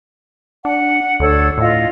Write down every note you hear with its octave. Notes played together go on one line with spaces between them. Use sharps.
D4 F#5
D2 D4 A4 C#5
A2 F4 D#5